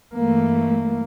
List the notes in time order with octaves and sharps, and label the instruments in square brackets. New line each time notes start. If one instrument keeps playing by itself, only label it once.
[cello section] G2 E3 A3 [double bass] A#3